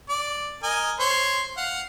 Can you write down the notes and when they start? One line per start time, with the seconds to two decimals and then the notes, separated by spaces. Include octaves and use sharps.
0.09 D5
0.63 A#4 D#5 G#5
1.00 C5 C#5
1.57 F5 F#5